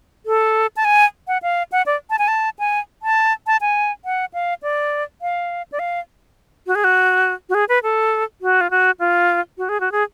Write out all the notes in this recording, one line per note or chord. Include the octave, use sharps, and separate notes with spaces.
A4
A5
G#5
F#5
F5
F#5
D5
A5
G#5
A5
G#5
A5
A5
G#5
F#5
F5
D5
F5
D5
F5
F#4
G#4
F#4
F#4
G#4
B4
A4
F#4
F4
F#4
F4
F#4
G#4
F#4
G#4